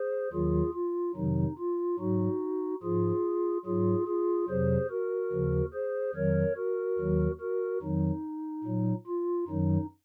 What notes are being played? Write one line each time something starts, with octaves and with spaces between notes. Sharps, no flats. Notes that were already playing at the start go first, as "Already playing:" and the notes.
Already playing: G#4 C5
D#2 D#3 F#3 F4 G#4
F4
F2 C3 D#3 F#3 D#4
F4
G#2 F#3 D#4 F#4
G#2 F3 F4 G#4
G#2 F#3 F4 G#4
F4 G#4
F2 C3 F#3 G#4 C5
F#4 A#4
D#2 C#3 F3
G#4 C5
F2 D#3 F#3 A#4 C#5
F#4 A#4
D#2 D#3 F#3
F#4 A#4
F2 D#3 F#3 D#4
A#2 F#3
F4
F#2 D#3 F#3 D#4